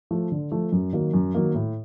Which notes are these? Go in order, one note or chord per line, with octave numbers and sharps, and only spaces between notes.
F3 A3
D3
F3 A3
F#2
D#3 F#3 A#3
F#2
D#3 F#3 A#3
A2